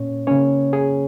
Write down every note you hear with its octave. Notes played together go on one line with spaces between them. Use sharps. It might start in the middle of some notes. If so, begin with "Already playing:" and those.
Already playing: A#2 A#3 C#4 C#5
C#3 A#3 C#4 C#5
G#4